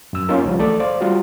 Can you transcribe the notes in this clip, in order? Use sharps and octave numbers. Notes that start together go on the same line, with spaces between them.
F#2 E6
A#3 C#4 D#4 F4 A#4
C2 F3 G3
E3 A3 A4 D5
C5 D5 F5
G3 F4 F#4